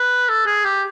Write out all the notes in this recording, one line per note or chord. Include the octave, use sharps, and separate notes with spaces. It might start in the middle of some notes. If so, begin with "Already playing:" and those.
Already playing: B4
A4
G#4
G4